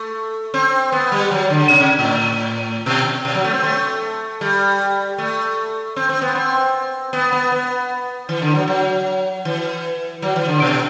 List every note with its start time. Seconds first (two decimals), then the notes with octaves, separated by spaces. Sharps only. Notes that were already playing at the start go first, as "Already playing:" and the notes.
Already playing: A3
0.54 C4
0.92 B3
1.12 G3
1.31 F#3
1.50 D3
1.70 C3
1.80 C3
1.99 A2
2.86 B2
3.25 B2
3.35 F#3
3.44 A3
3.54 C4
3.64 A3
4.41 G3
5.18 A3
5.96 C4
6.09 C4
6.22 B3
6.35 C4
7.13 B3
7.32 B3
7.52 B3
8.29 E3
8.42 D3
8.55 F#3
8.67 F#3
9.45 E3
10.22 F#3
10.36 E3
10.48 D3
10.62 B2